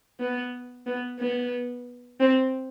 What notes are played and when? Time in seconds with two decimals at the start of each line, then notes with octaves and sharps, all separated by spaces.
0.20 B3
0.87 B3
1.19 B3
2.21 C4